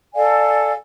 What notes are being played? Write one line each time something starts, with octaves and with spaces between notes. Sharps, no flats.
A4 D5 F5 G#5